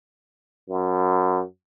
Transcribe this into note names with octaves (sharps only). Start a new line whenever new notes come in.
F#2